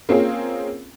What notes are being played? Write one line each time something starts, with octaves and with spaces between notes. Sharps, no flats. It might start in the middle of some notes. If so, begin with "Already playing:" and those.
A#3 C4 C#4 F4 G#4